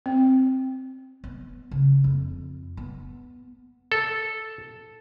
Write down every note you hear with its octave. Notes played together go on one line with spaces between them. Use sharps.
C4
B3
C#3
F2
B3
A4